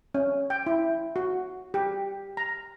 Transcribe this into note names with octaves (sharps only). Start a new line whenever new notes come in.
C#4
G5
E4
F#4
G4
A#5